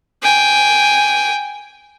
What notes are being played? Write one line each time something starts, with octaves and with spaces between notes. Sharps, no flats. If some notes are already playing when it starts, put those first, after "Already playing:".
G5 G#5